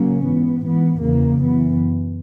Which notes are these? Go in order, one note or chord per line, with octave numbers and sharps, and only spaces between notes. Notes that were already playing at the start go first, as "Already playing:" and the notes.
Already playing: C#3 F#3 A#3 C#4
G#2 E3 B3
G#2 E3 B3
E2 C#3 E3 A#3
F#2 E3 B3